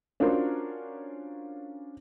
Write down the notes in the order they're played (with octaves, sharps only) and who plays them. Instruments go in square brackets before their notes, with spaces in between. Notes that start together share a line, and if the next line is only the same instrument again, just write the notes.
[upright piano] C#4 D4 F4 F#4 A#4 C5